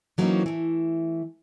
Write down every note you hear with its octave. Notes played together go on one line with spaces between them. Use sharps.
E3 F#3 A#3 C4 C#4 D#4
E3 A3